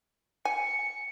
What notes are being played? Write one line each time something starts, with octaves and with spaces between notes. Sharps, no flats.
G#5 C#7